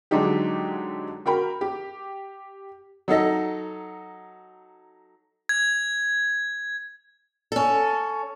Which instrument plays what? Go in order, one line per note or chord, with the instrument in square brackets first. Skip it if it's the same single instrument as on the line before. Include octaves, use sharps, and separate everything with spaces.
[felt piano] D3 F#3 G#3 D4 D#4 G4
F#4 A#4 G5 B5
G4
[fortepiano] F#3 D#4 A4 D#5
[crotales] G#6
[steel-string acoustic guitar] C#4 A4